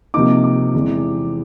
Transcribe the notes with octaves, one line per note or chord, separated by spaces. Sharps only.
C3 F3 A#3 D#4 D6
D6
E2 C3 E3 G#3